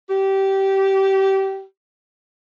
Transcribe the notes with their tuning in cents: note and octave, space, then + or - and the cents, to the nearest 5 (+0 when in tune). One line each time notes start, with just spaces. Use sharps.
G4 -20